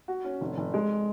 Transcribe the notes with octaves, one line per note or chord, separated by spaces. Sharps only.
F#4
C#4
F1
F1
G#3